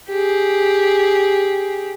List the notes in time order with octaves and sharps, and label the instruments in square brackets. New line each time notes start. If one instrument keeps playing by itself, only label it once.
[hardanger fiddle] G4 G#4